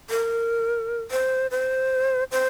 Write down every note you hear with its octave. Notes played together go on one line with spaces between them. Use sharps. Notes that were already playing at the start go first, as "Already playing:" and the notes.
A#4
C5
C5
C5